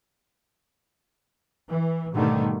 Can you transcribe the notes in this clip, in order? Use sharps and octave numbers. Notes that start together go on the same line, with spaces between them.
E3
G#2 B2 D3 D#3 G3 A3